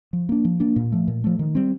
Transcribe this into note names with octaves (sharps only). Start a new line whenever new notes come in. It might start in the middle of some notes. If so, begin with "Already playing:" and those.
F3
A#3 D4
F3
A#3 D4
A#2
F3 A3
A#2
F3 A3
D#3
G3 C4